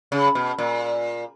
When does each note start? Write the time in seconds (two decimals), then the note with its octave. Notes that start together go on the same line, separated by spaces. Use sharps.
0.12 C#3
0.35 B2
0.58 A#2